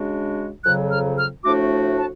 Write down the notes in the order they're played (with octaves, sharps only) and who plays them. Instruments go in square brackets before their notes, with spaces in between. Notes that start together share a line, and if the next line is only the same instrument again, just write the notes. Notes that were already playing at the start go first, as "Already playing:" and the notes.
Already playing: [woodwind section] C#3 G#3 D4 F#4
[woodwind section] F2 C#3 F#3 [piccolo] F#6
[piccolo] F6
F6
[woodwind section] A2 F3 A3 D4 F#4 [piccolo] D6
[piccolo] A5